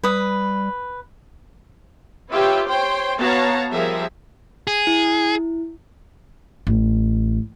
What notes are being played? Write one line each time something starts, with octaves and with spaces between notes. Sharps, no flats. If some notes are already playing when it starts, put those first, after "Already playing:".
G3 B4 D#6
F4 G4 B4 C#5 E5 G5
C5 C#5 G5 C6
B3 F#4 C#5 F5 A5 A#5
F3 G3 G#4 A#4 E5
G#4
E4
A1